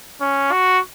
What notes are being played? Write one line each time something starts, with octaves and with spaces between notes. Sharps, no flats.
C#4
F#4